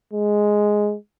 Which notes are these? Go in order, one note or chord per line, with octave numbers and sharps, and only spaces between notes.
G#3